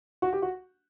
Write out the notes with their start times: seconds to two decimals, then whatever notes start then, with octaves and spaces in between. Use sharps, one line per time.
0.22 F#4
0.33 G4
0.42 F#4